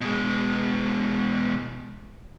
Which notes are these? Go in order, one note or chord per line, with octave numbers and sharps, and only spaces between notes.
B2 G#3